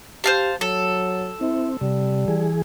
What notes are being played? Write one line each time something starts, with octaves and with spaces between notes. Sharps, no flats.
G4 C5 F5 A5
F#3 A4
C4 E4
C3 G3
E3 G#4